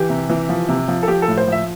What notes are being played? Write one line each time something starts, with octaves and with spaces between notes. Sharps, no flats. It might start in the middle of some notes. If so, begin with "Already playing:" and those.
Already playing: E3 G4
C3
E3
F3
C3
F3
A4
F3 G4
A4
A2
C5
F3 E5